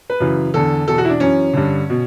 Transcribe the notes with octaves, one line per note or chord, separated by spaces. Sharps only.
B4
F#2 C#3 E3
E2 D3 A4
E2 B2 A4
F#4
E4
D4
F#2 E3 C#4
G2 D3
B2